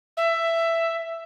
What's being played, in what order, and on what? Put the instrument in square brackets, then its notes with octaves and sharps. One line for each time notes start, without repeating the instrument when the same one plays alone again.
[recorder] E5